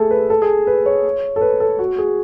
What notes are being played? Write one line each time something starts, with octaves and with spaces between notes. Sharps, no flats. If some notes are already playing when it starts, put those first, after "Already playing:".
Already playing: A3 G#4 A4
B4
A4
G#4
B4
C#5
A4
B4
A4
F#4
G#4